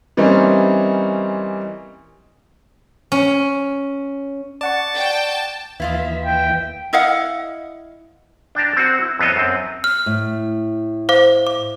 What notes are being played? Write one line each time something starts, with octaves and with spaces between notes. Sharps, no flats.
E3 G3 A#3 C4 C#4 D#4
C#4
D5 F#5 A5 C#6
G5
D#2 E3 E4 F4 D#5 E5
G5
E4 D#5 F5 F#5
D4 G5 A5 A#5
C4 F#4
E4
F2 B3 F4 C#5 D#5 E5
F#2 C4
F6
A2
C5 F5 D6
D6